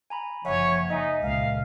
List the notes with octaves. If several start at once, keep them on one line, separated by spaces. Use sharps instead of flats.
G#5 A#5 B5
F#1 C#3 F3 C#5 E5 F#5 G#5
D#4 D#5 E5 G#5
C#2 A#2 F5